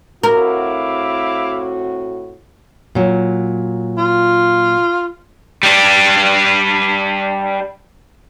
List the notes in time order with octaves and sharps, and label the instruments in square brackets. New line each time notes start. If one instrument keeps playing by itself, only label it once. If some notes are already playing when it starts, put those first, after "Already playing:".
[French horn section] A2 C4 F#4 [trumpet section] E4 F5 D6 [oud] A#4
[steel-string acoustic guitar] A#2 F#3
[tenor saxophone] F4
[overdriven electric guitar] G3 D4